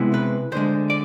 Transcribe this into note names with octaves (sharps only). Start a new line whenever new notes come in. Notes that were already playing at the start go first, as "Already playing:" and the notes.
Already playing: C3 G#3 B3 E4
B4
D2 D3 G#3 C5
D5